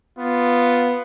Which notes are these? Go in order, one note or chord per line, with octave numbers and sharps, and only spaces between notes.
B3 F4